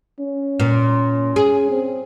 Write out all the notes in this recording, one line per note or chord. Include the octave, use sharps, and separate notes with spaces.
C#4
A#2
G#4
C4